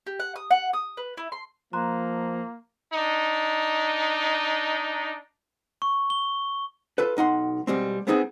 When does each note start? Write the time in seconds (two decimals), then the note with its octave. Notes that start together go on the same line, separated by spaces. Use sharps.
0.07 G4
0.20 F#5
0.36 D#6
0.51 F#5
0.73 D#6
0.97 B4
1.17 E4
1.32 C6
1.73 F3 A#3 A#5 C6 F#6
2.93 D4 D#4
5.82 C#6
6.10 G7
6.98 F4 A4 B4
7.17 B1 D#4 F#5 C6
7.67 B2 G3 G#3 C4
8.07 G#3 B3 C4 D#4 G#4